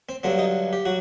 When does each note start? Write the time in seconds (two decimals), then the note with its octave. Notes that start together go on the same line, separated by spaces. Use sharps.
0.09 C4
0.23 G2 D3 F#3 C4
0.39 D#4
0.73 G4
0.86 F#3 F#4